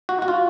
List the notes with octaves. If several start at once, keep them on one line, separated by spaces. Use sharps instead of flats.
F#4
F#4
F4